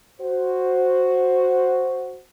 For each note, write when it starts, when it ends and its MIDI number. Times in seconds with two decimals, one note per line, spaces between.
0.20 2.21 66
0.20 2.21 72